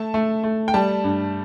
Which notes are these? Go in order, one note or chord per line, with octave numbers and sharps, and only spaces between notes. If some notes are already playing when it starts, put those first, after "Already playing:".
Already playing: A3 A5
A3
A3
G5
G3 A5
G2